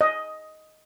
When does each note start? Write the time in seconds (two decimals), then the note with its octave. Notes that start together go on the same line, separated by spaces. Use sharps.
0.01 D#5